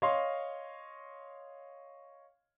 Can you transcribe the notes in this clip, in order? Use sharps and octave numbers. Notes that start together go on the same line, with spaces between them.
C#5 D#5 F5 C6